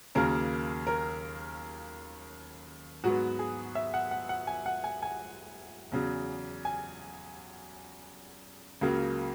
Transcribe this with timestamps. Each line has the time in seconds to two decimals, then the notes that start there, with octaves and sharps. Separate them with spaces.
0.15 D#2 C#3 F#3 A#3 A#4
0.87 A#4
3.04 G#2 F#3 B3 F#4
3.39 G#4
3.75 E5
3.94 F#5
4.11 F#5
4.29 F#5
4.47 G#5
4.66 F#5
4.84 G#5
5.02 G#5
5.92 E2 C#3 F#3
6.65 G#5
8.81 C#2 C#3 F#3 A#3